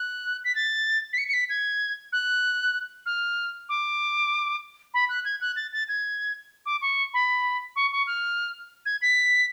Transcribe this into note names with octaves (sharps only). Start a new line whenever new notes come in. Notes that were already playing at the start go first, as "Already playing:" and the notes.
Already playing: F#6
B6
A6
B6
C#7
C#7
B6
G#6
F#6
F6
D6
B5
F#6
G#6
F#6
A6
A6
G#6
D6
C#6
B5
C#6
C#6
F6
G#6
B6